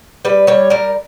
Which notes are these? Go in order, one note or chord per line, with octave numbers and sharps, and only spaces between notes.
G3 B4
G3 C#5
G3 A#4